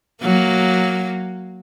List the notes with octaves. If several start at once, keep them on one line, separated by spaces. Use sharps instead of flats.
F#3 A#3